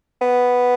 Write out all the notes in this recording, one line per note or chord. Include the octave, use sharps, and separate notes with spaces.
B3